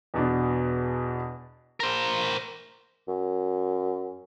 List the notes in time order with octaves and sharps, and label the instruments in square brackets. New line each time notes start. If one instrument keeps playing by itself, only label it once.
[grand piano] E2 B2 D4
[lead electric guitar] A#4 C5
[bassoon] F#2